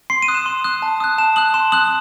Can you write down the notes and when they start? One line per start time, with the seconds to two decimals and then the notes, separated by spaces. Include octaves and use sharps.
0.10 C6 C7
0.22 D#7
0.28 D#6 F#6
0.34 E7
0.46 C6
0.64 D#6 F#6
0.82 A5
1.00 D#6 F#6
1.18 A5 E7
1.36 D#6 F#6 F#7
1.54 C6 E7
1.72 D#6 F#6 F#7